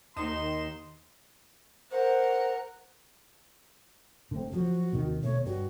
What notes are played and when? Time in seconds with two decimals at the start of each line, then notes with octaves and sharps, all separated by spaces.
0.16 D#2 D#4 C6 E7
1.91 A#4 C5 F#5
4.31 D3 A3 C4
4.52 F3 F#3 F#4
4.93 D#2 C3 D#3
5.23 B2 D3 A3 C#5
5.46 G2 F#4